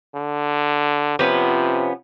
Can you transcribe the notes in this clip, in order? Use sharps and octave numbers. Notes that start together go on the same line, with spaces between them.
D3
C3 F3 B3 C#4